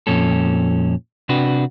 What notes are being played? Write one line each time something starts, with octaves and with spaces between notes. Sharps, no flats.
F2 A#2 C#4 A4
C3 D4 F#4 B4